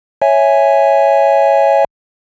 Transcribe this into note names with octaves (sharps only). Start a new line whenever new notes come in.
C#5 E5 G#5